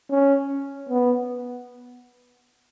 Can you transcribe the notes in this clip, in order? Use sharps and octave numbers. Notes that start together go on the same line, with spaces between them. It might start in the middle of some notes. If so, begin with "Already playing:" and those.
C#4
B3